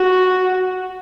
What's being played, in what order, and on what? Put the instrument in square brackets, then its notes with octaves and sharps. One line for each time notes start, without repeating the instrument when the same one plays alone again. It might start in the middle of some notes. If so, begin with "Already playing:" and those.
Already playing: [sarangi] F#4